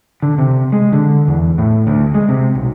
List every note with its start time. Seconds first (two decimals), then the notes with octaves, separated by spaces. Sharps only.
0.22 D3
0.38 C3
0.72 G#3
0.93 D3
1.28 E2
1.58 A2
1.87 D2
2.14 G#3
2.29 C3
2.55 B1